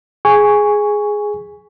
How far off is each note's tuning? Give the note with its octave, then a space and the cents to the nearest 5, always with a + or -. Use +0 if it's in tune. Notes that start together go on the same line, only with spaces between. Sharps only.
G#4 +5 G#5 -10 C#6 +10